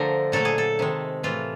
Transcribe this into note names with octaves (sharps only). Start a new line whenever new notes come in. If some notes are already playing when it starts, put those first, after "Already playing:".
Already playing: D3 F3 A3 A#4 C5
A#2 F#3 A3 A4
G#4
A4
C3 D#3 G#3
A2 E3 A3 F4